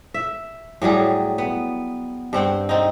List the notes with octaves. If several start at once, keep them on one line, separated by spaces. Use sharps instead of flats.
E5
A2 F#3 G3 G#4
B3
G2 C4 F#5 G5
C4 D#4